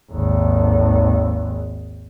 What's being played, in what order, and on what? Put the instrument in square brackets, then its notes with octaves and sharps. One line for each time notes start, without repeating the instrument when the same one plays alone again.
[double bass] G#1 D#2